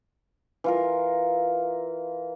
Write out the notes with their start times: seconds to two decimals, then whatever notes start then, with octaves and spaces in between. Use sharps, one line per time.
0.64 E3 F4 A#4